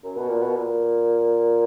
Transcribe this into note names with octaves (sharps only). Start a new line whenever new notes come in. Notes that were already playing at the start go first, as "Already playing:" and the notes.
F#2
B2
A#2
B2
A#2